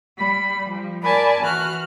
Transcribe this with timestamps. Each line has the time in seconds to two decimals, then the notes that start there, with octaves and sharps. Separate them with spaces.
0.16 G3 B5
0.69 F3 G3
1.03 A#4 D5 G#5 A5 B5
1.41 E3 F#4 F6 F#6